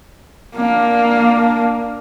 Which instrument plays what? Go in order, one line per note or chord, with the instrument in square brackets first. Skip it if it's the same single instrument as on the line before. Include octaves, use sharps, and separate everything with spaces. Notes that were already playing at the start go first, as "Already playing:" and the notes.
[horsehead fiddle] A#3 D4